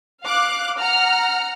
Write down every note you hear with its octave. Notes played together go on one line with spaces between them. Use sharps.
F5 D6 F#6
F#5 A#5 F6